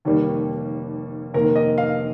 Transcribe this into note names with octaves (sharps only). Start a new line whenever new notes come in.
F1 D#2 D#3 G3 A#3
F1 D#2 D#3 A#3 A#4
D#5
F5